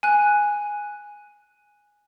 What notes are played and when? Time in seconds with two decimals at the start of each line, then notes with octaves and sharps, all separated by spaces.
0.03 G#5 F#6